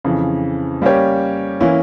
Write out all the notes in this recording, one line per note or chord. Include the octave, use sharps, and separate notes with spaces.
F2 C#3 E3
G3 A#3 C#4 G4 C#5
E3 A#3 C#4 E4